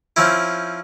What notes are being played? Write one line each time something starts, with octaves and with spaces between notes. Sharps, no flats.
F3 C4 C#4 E4